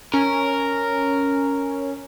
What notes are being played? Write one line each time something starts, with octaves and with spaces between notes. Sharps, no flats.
C#4 A#4